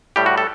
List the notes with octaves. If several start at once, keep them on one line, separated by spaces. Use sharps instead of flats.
A2 G3 G4
F#4
A4